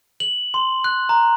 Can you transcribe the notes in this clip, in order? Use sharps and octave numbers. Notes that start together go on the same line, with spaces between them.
F#7
C6
F#6
A#5